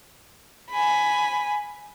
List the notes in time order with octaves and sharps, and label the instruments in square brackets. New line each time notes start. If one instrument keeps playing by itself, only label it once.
[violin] G#5 B5